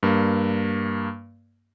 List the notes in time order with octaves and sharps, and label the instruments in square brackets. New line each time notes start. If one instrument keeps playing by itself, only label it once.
[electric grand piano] G2 A#3